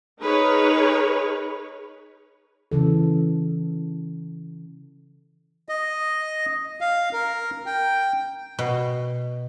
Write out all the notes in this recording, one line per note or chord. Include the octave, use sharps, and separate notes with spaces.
D#4 G#4 A#4 B4 C#5
C#3 E3 A4
D#5
F5
A#4
G5
B2